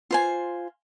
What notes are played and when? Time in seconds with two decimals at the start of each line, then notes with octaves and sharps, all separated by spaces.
0.11 F4 C5 G#5